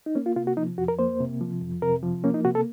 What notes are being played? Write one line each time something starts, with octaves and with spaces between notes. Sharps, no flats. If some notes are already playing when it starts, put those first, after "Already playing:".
D#4
A#3 C#4
F4
C3 F4
F#4
F3 D#4
F2 F#4
A#4
A#3 C5
C3
F3
F2
C3 A#4
F3
A#3 C#4
D#4
C3 F#4
A4